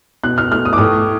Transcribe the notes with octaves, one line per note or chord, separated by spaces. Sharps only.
B2 F#6
F6
A3 F6
D#6
D6
A2 D#6